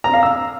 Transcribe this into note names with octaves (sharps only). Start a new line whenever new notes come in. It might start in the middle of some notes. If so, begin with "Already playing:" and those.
A#5
F5
E6